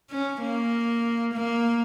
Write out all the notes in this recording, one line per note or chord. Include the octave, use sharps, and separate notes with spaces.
C#4
A#3
A#3